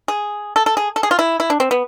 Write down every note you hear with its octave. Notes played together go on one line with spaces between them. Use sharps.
G#4
A4
A4
G#4
A4
G#4
F4
E4
E4
D4
C4
B3